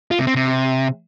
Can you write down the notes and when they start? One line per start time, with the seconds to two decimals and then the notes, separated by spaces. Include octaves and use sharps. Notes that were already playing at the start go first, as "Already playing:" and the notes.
0.11 F4
0.19 C3
0.27 C4
0.35 C3